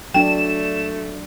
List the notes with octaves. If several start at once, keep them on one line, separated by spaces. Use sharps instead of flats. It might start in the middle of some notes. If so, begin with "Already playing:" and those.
F#3 A3 D4 G5 E7